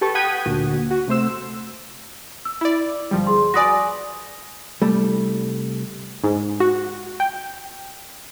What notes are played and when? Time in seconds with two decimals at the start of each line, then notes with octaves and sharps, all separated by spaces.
0.01 G4 A4 B4 C#6
0.15 F#5 G5 D#6 G#6 B6 D#7
0.46 D2 A#2 F#4
0.91 F#4
1.07 C3 A3 C5 E6
2.45 E6
2.61 E4 D5
3.11 G1 F3 G3
3.27 G#4 C6
3.54 F#4 B4 D5 G#5 D#6 A#6
4.82 C2 G3 A3
6.24 G#2
6.60 F#4
7.20 G5